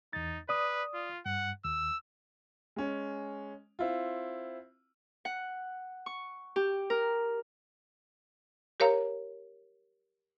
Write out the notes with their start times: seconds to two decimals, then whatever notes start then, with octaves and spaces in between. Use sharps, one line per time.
0.13 E2 D#4 A6
0.49 B4 D5 D#6
0.94 F4
1.26 G2 F#5
1.65 D#2 E6
2.76 G#3 C#4
3.79 C4 E4 F4
5.25 F#5
6.06 C#6
6.56 G4
6.90 A#4
8.80 G4 A#4 C#5 F5 A#5